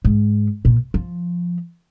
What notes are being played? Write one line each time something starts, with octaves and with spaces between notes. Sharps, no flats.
G#2
A#2
F3